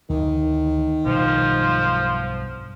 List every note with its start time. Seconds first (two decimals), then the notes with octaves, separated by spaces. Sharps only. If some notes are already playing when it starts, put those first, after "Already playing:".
0.10 D2 D#3 E3
1.06 B1 G2 B2 F3